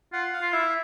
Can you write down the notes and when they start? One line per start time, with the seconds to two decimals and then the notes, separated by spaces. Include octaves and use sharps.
0.13 F4 F#5
0.33 F5
0.41 F4
0.53 E4 E5